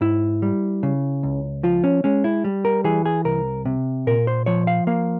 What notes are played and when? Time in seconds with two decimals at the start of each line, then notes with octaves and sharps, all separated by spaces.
0.01 G#2 E4
0.42 G3
0.83 C#3
1.23 C#2
1.63 F3 F4
1.84 C#4
2.04 G#3 C#4
2.24 E4
2.44 G3
2.65 A#4
2.84 E3 G#4
3.06 G#4
3.25 C2 A#4
3.65 C3
4.07 A#2 A#4
4.27 C5
4.46 F3 C#5
4.67 F5
4.87 A#3 F5